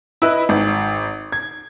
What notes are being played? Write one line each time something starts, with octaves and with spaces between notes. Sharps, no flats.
E4 B4 D#5
G#1
G#6